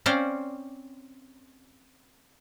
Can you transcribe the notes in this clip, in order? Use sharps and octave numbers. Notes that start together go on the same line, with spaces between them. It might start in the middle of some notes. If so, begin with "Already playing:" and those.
C4 C#4 C5 D5 F5